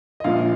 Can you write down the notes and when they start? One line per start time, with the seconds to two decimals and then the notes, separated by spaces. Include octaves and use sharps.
0.20 D#5
0.24 A#1 A#2 F3 F5